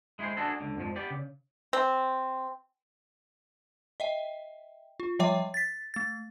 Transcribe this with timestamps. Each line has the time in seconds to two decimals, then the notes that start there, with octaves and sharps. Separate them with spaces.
0.19 G#3 E4 F4 G#4 C5
0.37 D4 F#4 G#4 A4
0.60 C#2 D3
0.77 F2 G#2 F3
0.96 B3 G4 D5
1.10 C#3
1.73 C4
4.00 D#5 E5 G5
5.00 F4
5.19 F3 G3 C#5 E5 G5 D6
5.54 A6 B6
5.94 A3 A6